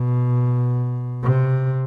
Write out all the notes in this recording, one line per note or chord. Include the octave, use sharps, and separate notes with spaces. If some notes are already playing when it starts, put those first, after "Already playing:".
Already playing: B2
C3